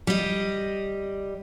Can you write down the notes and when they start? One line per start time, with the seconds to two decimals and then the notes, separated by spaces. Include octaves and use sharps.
0.07 G3 D#5